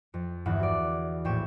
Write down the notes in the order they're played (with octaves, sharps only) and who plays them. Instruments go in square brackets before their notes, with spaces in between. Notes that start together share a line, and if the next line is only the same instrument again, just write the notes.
[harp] F2
G1 E2 G2 E5 F#5
F#4 D5
A#1 A2 G5 C#6 E7